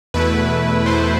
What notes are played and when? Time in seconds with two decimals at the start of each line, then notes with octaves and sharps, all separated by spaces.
0.14 E2 B2 A3 E4 B4
0.86 E2 B2 A3 E4 C5